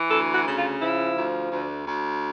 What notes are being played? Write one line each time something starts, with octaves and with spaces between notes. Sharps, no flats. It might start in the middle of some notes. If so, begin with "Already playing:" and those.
Already playing: E3
D2 A4
F#4
C#3
F4
F3 E4
D2
D2
D2